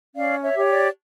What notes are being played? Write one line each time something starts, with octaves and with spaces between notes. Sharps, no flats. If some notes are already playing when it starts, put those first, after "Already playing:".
C#4 D5 F5
C#5 E5
G4 C#5
D5